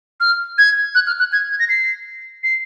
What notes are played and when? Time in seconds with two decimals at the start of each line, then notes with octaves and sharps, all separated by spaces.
0.20 F6
0.58 G#6
0.95 F#6
1.07 F6
1.19 F#6
1.32 G#6
1.51 G#6
1.59 A#6
1.69 C7
2.43 C7